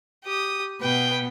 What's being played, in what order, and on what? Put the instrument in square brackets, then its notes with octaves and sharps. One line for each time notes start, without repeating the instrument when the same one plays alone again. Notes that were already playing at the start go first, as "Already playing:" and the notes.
[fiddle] G4 D#6
[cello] B2 B3 [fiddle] B4 G5